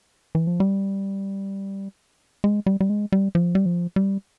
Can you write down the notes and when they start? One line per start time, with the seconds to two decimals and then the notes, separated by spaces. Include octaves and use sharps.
0.35 E3
0.47 F3
0.60 G3
2.44 G#3
2.66 G3
2.81 G3
2.90 G#3
3.12 G3
3.35 F3
3.55 G3
3.66 F3
3.96 G3